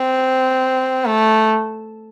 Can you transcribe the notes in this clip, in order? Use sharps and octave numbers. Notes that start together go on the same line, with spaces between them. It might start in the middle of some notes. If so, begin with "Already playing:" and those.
Already playing: C4
A3